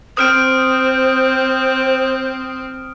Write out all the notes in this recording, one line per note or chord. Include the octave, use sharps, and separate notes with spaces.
C4 C5 D#6 F6 D7